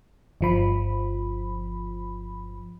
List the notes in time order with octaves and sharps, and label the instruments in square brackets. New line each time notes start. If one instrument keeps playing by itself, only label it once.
[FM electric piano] G1 F3 B5